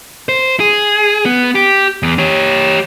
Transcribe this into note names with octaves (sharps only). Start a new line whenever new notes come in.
C5
G#4
B3
G4
E2
G4 C#5